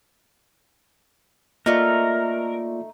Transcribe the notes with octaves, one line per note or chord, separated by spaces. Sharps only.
A3 A#3 D#4 F4 A#4 D5